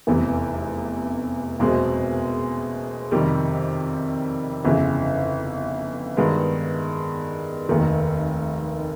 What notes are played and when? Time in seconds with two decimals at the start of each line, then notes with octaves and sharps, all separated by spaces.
0.07 F1 E2 C3 E3
1.59 F#1 E2 B2 G#3 C4
3.11 F2 C3 D#3 G3
4.65 G1 F2 C#3 E3
6.17 G2 D#3 G#3 B3
7.69 F1 D#2 D#3